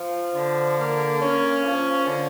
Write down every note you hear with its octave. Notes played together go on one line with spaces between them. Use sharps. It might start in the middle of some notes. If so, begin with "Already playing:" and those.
Already playing: F3
D3
A#3
C#4
F3
D3